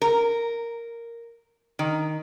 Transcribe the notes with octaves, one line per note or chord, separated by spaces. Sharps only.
A#4
D#3